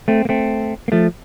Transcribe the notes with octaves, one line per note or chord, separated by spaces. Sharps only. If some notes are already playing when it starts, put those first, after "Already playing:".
A3 C4
A#3
A3 C4
A#3
F3 A3